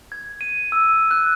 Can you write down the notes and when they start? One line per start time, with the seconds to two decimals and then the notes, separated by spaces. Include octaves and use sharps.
0.12 G#6
0.41 D#7
0.72 E6
1.11 F#6